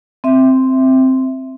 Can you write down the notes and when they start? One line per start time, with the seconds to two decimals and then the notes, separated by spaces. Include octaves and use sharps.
0.24 C4 E5